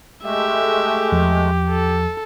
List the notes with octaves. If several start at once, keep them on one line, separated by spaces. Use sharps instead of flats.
G#3 A3 G4 E5
E2 F3
A4